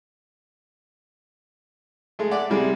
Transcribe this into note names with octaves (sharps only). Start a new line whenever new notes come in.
G#3 A3
D5 E5 F#5 D6
C3 G3 G#3